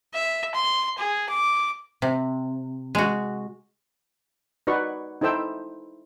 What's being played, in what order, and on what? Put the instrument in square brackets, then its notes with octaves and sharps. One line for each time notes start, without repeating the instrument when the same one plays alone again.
[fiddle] E5
C6
G#4
D6
[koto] C3
G#3 F#4
[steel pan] D#4 F#4 B4 D5 C#6
D#4 E4 A4 C5 G5 E6